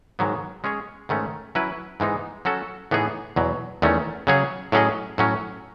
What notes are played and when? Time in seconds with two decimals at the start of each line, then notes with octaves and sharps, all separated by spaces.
0.19 G#2 D#3 F#3 B3
0.64 G#3 C#4 G#4 C#5
1.09 G#2 D#3 A3 C#4
1.55 F#3 C#4 E4 B4
2.00 G#2 E3 G#3 B3 D#4
2.45 F#3 C#4 F#4 A4
2.91 A2 E3 B3 D#4 G#4
3.36 E2 B2 F#3
3.82 E2 D#3 A3 C#4
4.27 C#3 F#3 C#4 G#4 C#5
4.72 A2 F#3 C#4 G#4 D#5
5.18 A2 F#3 C#4